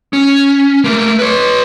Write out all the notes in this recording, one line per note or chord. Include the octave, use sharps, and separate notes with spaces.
C#4
A3 A#3
B4 C#5